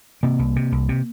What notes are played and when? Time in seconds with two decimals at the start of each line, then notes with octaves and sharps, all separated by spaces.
0.23 C3 A#3
0.39 C2
0.56 C3
0.72 C2
0.89 C3